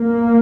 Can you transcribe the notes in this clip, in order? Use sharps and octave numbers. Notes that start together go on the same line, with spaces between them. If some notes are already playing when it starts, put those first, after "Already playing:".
Already playing: A#3